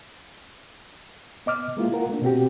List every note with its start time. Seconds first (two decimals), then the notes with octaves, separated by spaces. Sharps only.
1.46 B3 D#5 D6 F6
1.77 G#3 A#3 E4 F4
1.92 F4 A#4 F#5
2.09 A3 A#3 D4
2.22 B2 C4 F#4 G4